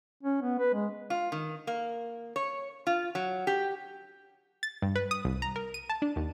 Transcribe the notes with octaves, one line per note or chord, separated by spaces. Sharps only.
C#4
B3
B4
G#3
F4
D#3
A#3
C#5
F4
F#3
G4
A6
G2
B4
D#6
C2
A#5
A#4
D#7
A5
D4
D#2